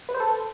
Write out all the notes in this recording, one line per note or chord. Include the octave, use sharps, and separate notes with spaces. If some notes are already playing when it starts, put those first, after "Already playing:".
B4
C5
A4